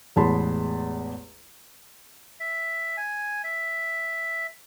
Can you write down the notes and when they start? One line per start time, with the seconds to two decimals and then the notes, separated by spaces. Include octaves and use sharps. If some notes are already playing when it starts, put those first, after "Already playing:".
0.16 A1 E2 G#3 A5 B5 C6
2.40 E5
2.97 G#5
3.44 E5